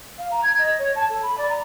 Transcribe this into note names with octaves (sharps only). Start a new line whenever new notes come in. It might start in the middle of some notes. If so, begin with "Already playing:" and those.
F5
A#5
G#6
D#5
C#5
A5
A4
B5
D5
A#5